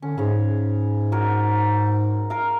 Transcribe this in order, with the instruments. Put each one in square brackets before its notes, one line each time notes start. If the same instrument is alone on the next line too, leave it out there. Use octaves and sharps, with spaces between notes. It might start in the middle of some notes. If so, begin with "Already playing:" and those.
[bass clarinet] D3 [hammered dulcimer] C#4
[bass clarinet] G#2 [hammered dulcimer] C#3 C#5
[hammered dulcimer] F#4 A#4 C#5
A#4 F5